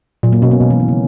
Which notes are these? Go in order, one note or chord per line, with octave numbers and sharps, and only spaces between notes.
A#2 F#3
A#3
B2 C#4
B3
B2 G#3
E3
D#3
C#3